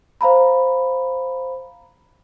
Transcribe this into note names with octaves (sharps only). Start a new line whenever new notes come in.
C5 F5 A#5 B5